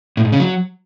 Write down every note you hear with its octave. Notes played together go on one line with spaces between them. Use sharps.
A2
G#2
C#3
F#3